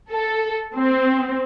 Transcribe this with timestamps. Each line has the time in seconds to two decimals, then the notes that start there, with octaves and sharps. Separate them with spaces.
0.11 A4
0.75 C4